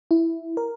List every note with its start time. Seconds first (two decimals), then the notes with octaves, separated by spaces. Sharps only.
0.11 E4
0.57 A#4